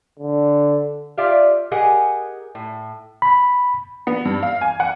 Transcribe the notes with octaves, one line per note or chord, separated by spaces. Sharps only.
D3
F4 G4 D5 E5 F5
G4 G#4 A#4 D#5 F#5 G#5
A2
B5
B3
G2
F5
G#5
F#5